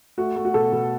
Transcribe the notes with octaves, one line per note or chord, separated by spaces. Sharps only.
A3 F#4
A3
F#4
B2 A4
B2